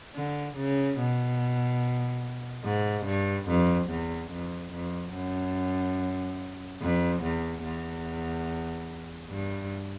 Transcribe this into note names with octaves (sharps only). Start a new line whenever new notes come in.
D3
C#3
B2
G#2
G2
F2
E2
F2
F2
F#2
F2
E2
E2
G2